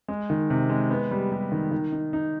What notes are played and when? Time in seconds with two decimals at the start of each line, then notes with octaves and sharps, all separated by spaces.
0.08 G#3
0.30 D#3
0.50 C3
0.70 G#3
0.91 B3
1.11 G3
1.32 G3
1.52 D#3
1.71 D#3
1.92 D#4
2.13 D#4